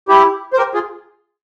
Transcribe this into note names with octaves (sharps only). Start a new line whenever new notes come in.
E4 G4
C5
G4 A#4
F4 G#4